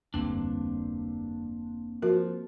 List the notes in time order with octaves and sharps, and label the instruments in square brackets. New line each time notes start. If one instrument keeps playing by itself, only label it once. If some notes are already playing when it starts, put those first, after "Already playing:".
[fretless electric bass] F1 D2 [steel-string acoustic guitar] G2 [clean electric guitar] A#3 C4 D4
[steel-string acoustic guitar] F3 [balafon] F#4 A#4